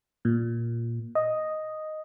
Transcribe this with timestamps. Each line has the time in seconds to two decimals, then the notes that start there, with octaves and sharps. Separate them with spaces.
0.25 A#2
1.15 D#5